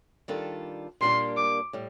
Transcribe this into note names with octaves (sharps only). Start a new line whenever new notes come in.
D#3 G3 D4 F4 A4
A#2 G3 A#3 D4 G4 C6
D6
A2 G3